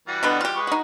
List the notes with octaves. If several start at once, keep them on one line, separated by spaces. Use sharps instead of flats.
E3 G3 F#4
B2 D3 B3
F4 G4
G#3 B4 C#6
D#4 F#4